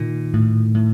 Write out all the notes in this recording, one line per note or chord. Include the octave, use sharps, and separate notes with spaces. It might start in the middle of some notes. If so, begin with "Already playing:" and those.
Already playing: A#2 D#3
A2
A2